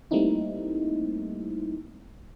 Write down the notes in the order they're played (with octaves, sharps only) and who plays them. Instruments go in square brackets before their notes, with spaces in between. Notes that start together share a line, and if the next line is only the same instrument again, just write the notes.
[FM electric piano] G3 A3 A#3 C4 D#4 E4